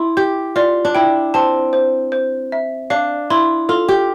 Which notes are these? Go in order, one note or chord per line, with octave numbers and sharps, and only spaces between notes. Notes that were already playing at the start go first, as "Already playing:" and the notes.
Already playing: E4 C6
G4 G6
F4 D5
D4
E4 G5
C4 A5
C5
C5
E5
D4 F5
E4 C6
F4 A4
G4